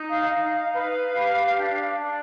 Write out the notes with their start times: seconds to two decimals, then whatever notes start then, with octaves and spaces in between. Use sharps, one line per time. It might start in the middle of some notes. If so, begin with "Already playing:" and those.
Already playing: D#4
0.10 F5
0.31 D#4 F5
0.52 F5
0.73 B4 F5
1.15 G4
1.57 D4
1.98 D4